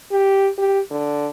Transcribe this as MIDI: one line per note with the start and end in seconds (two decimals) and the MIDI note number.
0.11 0.49 67
0.58 0.80 67
0.91 1.29 50